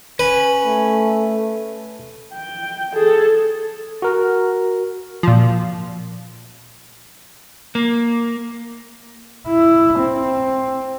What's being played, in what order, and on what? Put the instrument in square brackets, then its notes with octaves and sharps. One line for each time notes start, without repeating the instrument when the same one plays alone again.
[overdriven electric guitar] C#4 [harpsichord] B4
[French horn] A3
[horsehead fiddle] G5
G#4 A4
[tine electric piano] F#4 A#4
[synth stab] A#2 F3
[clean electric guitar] A#3
[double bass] E4
C4